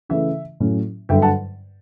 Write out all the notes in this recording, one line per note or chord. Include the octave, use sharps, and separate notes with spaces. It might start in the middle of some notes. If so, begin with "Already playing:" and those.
C#3 E3 A3 E5
A2 F#3 C#4
G2 D3 F#3 E5 G5
F#5 A5